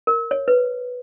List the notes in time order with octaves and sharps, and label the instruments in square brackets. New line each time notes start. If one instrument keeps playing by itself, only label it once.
[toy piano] A#4
C#5
B4